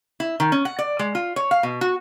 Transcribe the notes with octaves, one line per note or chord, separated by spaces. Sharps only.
E4
D#3
C#4
F#5
D5
G#3
F4
C#5
F5
B2
F#4